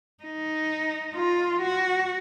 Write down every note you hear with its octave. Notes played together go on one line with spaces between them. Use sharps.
D#4
F4
F#4